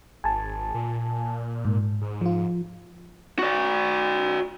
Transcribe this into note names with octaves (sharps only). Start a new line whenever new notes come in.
G#1 G#5 A5
A#2
G#2
G#2
F3 F4
F#4 D5